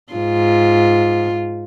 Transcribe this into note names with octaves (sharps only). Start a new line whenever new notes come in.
G#2 F4